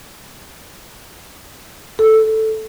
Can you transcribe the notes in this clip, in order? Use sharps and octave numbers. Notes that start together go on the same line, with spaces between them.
A4